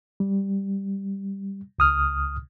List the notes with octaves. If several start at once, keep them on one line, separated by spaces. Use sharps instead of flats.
G3
C#2 D#6 F6